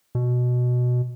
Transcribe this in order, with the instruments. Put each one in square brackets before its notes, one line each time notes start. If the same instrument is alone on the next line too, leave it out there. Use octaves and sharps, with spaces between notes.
[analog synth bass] B2